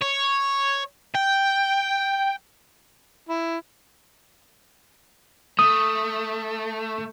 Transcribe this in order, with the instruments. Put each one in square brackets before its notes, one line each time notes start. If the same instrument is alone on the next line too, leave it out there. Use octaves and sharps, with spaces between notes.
[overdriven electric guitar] C#5
G5
[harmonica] E4
[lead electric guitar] A3 [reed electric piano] D#6